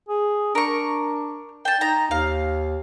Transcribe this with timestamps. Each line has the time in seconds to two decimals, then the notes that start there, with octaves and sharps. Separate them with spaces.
0.09 G#4
0.55 D4 A#4 C#6
1.65 G5 A5
1.81 D#4 A#5
2.11 D#2 F5